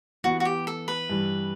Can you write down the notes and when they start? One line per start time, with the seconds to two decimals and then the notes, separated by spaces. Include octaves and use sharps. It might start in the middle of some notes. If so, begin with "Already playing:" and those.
0.24 E3 B3 E4 F#4
0.40 F#4
0.45 G4
0.67 A4
0.88 B4
1.10 G2 E3 G3